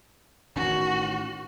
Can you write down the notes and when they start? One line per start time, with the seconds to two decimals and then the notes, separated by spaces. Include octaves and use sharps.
0.56 A1 D#3 C#4 F#4